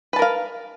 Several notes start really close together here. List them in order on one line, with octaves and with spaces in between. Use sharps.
B4 A5 A#4 F5